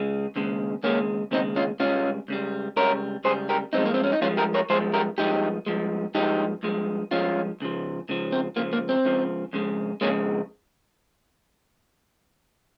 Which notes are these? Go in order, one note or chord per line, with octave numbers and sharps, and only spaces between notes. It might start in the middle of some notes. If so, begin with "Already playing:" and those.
Already playing: C#3 G#3
D#2 C#3 G#3
D#2 C#3 G#3 A#3 C#4
D#2 C#3 G#3 C4 D#4
C#4 F4
C#2 C#3 G3 C#4 F4
C#2 C#3 G3
C#2 C#3 G3 A#4 C#5
C#2 C#3 G3 G#4 C5
G4 A#4
G2 F3 G#3 C4 D#4
A#3
C4
C#4
D#4
G2 F3 G#3 C#4 F4
G4 A#4
A#4 C#5
G2 F3 G#3 G#4 C5
G4 A#4
G2 F3 G#3 D#4 G4
G2 F3 G#3
G2 F3 G#3 D#4 G4
G2 F3 G#3
G2 F3 G#3 C#4 F4
C#2 C#3 F3
C#2 C#3 F3
C4
C#2 C#3 F3 A#3
A#3
C4
C#2 C#3 F3
F2 C#3 G#3
F2 C#3 G#3 A#3 C#4